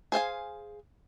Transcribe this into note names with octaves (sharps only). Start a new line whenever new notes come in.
G#4 C5 F5 G#5